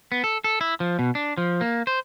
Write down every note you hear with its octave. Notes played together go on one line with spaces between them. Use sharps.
B3
A4
A4
E4
F3
B2
D4
F3
A#3
C5